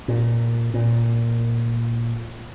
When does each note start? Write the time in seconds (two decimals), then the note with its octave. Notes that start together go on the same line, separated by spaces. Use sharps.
0.08 A#2
0.74 A#2